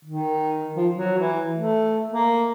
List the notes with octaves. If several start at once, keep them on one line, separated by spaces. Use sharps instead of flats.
D#3
F3
F#3
E3
A3
A#3